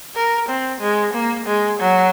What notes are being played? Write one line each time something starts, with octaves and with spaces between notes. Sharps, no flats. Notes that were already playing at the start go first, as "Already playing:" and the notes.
A#4
C4
G#3
A#3
G#3
F#3